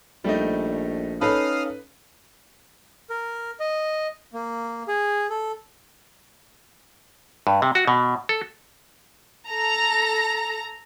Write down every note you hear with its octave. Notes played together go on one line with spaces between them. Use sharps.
A#1 G3 A3 D#4
C#4 D#4 A4 B4 F5 D#6 F6
A#4
D#5
A#3
G#4
A4
G2
C3
F#4
B2
A4
A4 A#5